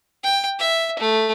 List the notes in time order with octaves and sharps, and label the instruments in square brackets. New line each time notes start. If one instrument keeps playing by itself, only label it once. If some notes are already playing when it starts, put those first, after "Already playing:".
[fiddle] G5
E5
A3